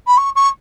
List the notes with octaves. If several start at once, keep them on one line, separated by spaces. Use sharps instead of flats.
B5
C#6
C#6